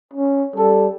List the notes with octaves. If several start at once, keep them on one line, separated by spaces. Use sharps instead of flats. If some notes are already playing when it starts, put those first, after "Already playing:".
C#4
G3 A4